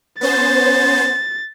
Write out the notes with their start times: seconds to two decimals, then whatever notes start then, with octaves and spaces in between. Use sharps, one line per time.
0.21 B3 C#4 C5 A6